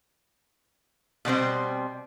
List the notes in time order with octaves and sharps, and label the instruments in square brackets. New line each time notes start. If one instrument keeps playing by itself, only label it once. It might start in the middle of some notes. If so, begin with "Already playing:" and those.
[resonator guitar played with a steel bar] B2 G3 C4 C5